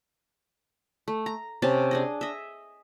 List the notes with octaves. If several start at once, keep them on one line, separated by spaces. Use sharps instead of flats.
A3
A#5
C3 C#4 A5
D4 G#4 D#5
D#5 E5